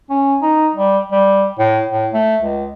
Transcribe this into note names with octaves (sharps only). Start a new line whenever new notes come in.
C#4
D#4
G3
G3
A2
A2
A3
C#2